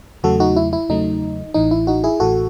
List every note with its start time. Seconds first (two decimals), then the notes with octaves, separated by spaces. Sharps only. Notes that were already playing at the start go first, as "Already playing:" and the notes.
0.23 E2 C#3 F#3 A3 F#4 A4
0.40 D#4 F#4
0.56 E4
0.73 E4
0.89 E2 C#3 F#3 A3 D#4
1.54 A1 A2 E3 D#4
1.71 E4
1.87 D#4 F#4
2.04 E4 G#4
2.20 A1 A2 E3 F#4 A4